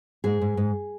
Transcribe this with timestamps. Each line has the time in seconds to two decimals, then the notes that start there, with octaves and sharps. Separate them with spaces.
0.24 G#2 G#4
0.41 G#2
0.57 G#2